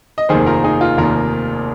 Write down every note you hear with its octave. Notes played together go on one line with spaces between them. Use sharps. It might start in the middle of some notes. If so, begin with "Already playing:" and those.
D#5
F1 D#2 D#3 G#4 C5
F4 A#4
D#4 G#4
F4
F1 D#2 D#3 F4 A#4